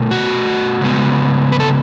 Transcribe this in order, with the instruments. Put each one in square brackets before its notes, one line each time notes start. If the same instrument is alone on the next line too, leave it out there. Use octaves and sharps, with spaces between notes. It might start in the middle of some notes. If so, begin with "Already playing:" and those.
Already playing: [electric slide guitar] B2 A3
F#4
C#3 G#3 B3
B4
A4